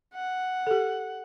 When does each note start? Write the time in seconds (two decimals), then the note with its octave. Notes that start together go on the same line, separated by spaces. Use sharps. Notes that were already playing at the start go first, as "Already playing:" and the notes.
0.14 F#5
0.67 G4 A4